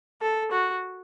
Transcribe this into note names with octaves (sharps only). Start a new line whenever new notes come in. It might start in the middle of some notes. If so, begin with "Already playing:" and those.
A4
F#4